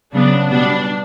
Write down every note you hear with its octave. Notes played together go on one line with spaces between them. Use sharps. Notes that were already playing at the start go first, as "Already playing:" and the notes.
C#3 F#3 B3 D4
B2 G3 B3 D4